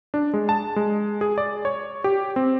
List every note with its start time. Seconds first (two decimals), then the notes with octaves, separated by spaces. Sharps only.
0.14 D4
0.34 G#3
0.49 A5
0.76 G#3
1.21 G#4
1.38 D5
1.65 C#5
2.04 G4
2.36 C4